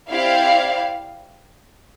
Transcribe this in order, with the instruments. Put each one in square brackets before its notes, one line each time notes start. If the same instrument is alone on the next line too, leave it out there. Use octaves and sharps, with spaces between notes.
[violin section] C4 E4 G4 D5 [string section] F5